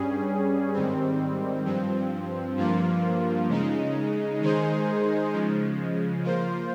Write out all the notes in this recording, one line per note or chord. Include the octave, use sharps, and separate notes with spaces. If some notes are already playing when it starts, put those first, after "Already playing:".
Already playing: G2 G3 C#4 G#4
G#2 D#3 G3 C4
G2 F3 C4
G2 F3 A#3 F4
C#3 G#3 D#4
D#3 G#3 D#4 G#4 C5
C#3 F3 G#3
F3 A#3 F4 C5